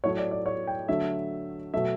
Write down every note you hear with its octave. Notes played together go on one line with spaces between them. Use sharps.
A2 F#3 A3 C#5
D5
D5
C#5
G5
D3 F#3 A3 E5
B2 F#3 A3 E5